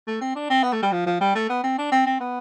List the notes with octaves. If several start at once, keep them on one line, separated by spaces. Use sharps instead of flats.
A3
C4
D4
C4
B3
A3
G3
F3
F3
G3
A3
B3
C4
D4
C4
C4
B3